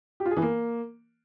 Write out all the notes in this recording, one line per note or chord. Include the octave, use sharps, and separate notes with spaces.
G4
F4
G#4
E3
A#3